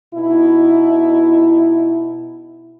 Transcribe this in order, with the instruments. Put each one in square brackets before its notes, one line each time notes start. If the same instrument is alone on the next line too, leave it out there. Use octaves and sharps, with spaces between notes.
[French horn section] B2 D#4 E4